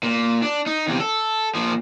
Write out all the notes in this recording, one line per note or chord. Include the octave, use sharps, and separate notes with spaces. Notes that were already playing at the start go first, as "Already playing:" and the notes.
A#2
D4
D#4
E2 C3
A4
A#2 F3